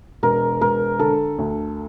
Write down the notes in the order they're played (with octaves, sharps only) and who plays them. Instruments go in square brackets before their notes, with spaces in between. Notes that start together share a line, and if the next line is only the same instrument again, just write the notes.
[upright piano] E1 [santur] A#4
[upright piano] E1 [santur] A#4
[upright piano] D3 [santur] A4
[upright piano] D2